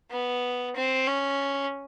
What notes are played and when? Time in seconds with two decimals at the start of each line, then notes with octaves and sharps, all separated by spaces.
0.11 B3
0.75 C4
1.07 C#4